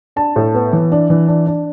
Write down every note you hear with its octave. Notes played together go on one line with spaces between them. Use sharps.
D4 A5
A2
B3
E3
D4
E3
D4
D4